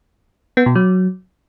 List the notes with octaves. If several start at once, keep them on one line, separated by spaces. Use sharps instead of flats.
B3
B2
F#3